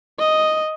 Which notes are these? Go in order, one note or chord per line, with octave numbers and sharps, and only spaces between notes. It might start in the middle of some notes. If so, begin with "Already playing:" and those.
D#5